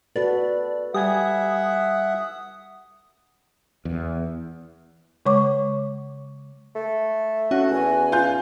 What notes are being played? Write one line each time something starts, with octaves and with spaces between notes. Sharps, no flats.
F#4 A4 B4 D5
G3 E5 F#5 G#5 D#6 G#6
E2
C#3 G#3 C#5 C#6 D6
A3
C#4 F#4
E2 G#5
F4 G6